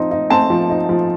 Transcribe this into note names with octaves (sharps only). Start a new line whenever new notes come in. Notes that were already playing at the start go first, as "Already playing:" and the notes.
Already playing: F3 C4 D#4
D#4
C4 A5
F3
D#4
F3